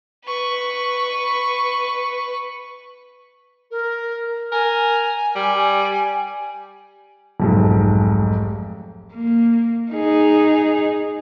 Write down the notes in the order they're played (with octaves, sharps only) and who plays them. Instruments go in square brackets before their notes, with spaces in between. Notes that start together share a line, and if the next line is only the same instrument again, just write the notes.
[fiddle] B4 C#6
[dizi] A#4
[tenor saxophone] A#4 [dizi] G#5
[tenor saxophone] G3
[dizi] G#5
[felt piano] F1 B1 G#2
[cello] A#3
D#4 G#4